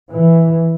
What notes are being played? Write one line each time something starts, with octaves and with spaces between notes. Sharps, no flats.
E3